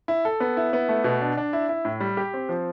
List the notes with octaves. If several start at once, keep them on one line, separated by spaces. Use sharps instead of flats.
E4
A4
B3
E4
B3
A3
B2
D4
D4
E4
E4
A2
G3
G4
C4
F3